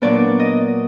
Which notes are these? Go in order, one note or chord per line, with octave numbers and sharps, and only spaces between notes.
A#2 F#3 B3 D4 D5
D#5